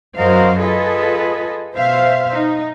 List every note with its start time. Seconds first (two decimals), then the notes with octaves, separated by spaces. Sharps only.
0.17 F#2 F#4 A#4 C5 D#5 F5
0.58 F4 G#4 A4 B4 D#5
1.76 B2 C5 E5 F5
2.33 D#4